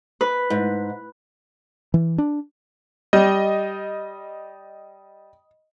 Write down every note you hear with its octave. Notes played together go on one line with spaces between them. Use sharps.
B4
G#2
E3
D4
G3 D#5